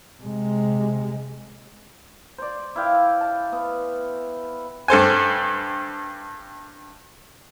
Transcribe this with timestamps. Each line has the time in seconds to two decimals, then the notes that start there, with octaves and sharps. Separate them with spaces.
0.22 C3 G#3
2.38 C5 D5
2.76 E4 D5 F5 G5
3.21 A5
3.52 B3
4.88 G2 A4 C5 G#5